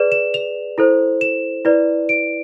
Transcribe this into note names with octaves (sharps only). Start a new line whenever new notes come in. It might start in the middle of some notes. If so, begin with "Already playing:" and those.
Already playing: G#4 B4 D5 E7
E7
F7
E4 A4 C5
E7
E4 B4 D5
D7